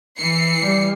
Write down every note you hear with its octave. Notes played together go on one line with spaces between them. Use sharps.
E3 C7 C#7
G3